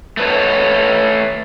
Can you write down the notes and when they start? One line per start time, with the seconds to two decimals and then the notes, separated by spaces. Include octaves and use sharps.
0.17 A3 B4 C#5